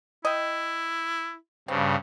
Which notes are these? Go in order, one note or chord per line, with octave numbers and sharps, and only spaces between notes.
E4 D#5 G5
G2 C#3 C4